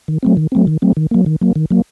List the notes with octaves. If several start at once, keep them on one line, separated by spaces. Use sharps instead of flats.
D#3
F#3 A3 C4
D#3
F#3 A3 C4
D#3
F#3 A3 C4
D#3
F#3 A#3
D#3
F#3 A#3
D#3
F#3 A#3